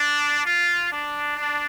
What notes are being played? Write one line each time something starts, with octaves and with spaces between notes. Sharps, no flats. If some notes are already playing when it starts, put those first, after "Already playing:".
Already playing: D4
F4
D4
D4